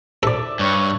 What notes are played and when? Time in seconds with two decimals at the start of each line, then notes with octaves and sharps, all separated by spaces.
0.23 A4 D5 E5
0.59 G2 C#5 C#6